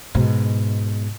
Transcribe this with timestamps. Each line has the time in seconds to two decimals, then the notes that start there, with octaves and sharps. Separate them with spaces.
0.15 G#2 B2